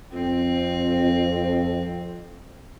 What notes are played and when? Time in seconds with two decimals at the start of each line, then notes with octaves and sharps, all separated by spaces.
0.13 F2 C4